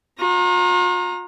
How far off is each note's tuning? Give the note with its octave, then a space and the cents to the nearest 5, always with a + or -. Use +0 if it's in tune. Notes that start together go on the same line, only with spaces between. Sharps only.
F4 +45 A#5 +0